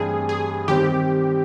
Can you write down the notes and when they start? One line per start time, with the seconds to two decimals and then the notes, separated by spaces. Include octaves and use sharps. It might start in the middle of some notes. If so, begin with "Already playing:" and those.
Already playing: G2 E3 A3 C4 G#4
0.29 G#4
0.68 D#3 G3 C4 G4